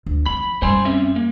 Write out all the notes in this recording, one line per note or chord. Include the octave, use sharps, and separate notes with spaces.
D2
F3 C4 B5
F#2 G3 C5 G#5 C6
C4 C#4 E5
A#3